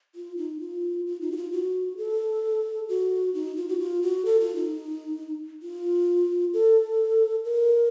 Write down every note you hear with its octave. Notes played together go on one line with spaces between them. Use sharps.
F4
D#4
F4
F4
D#4
F#4
F4
F#4
A4
F#4
D#4
F4
F#4
F4
F#4
A4
F4
D#4
F4
A4
A#4